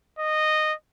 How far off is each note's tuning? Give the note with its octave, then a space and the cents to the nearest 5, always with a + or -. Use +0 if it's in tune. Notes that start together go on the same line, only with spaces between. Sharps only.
D#5 -15